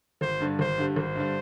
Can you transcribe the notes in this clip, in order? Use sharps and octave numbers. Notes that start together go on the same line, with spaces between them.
G#1 C5
G2 D3 G3
G#1 C5
G2 D3 G3
G#1 C5
G2 D3 G3